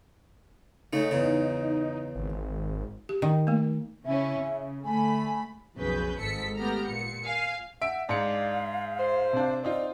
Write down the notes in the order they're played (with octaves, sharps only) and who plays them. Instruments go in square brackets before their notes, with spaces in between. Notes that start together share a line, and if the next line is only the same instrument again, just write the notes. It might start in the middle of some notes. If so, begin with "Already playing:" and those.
[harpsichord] C#3 A3 [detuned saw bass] D#4
[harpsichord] E2 C#3
[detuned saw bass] G#1
[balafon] G4
[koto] D#3
[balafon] A3 A#3
[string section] C#3 C#4 E4 [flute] E5
[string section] C#3
[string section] D3 A3 B5 [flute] G#5
[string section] B1 F2 C#3 B4 G6
G#1 G#2 A4 B6 C#7
A3 B3 G4 A#5 F6
A#2 C#7
F5 G#5
[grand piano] E5 D7 [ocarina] F#5
[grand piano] G#2 C#7 [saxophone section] D4 D5 [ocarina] F5
[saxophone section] C5
[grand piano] C3 D4
[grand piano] C4 D#4 F4 [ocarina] D5